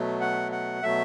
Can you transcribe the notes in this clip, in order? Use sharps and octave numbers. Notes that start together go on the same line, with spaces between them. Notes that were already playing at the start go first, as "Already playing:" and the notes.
Already playing: B2 F#3 A3
F#5
F#5
B2 F#3 A3 E5